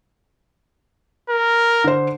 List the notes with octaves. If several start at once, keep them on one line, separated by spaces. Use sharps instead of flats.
A#4
D3 C5